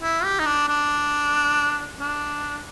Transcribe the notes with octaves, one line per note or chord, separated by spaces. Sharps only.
E4
G4
D#4
D4
D4
D4